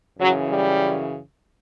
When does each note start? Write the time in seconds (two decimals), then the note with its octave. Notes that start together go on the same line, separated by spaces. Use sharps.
0.19 F#2 C#3 E3 F#3
0.51 G3